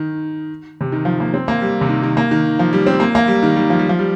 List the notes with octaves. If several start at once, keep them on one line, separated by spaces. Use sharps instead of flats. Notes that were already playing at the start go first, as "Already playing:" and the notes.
Already playing: D#3
C3
D#3
F3
A#3
C4
A#3
G3
C3
D#3
D#3
A#3
D#3
F3
G3
C4
A#3
A#3
G3
D#3
G3
F3
G3
F3
G3